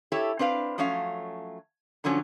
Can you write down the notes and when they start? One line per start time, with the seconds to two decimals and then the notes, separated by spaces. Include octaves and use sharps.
0.12 E4 G4 A4 C#5
0.39 C4 D4 B4 F5
0.78 F3 F#3 A3 C#4 F5
2.04 G2 D3 F3 F#3 C#4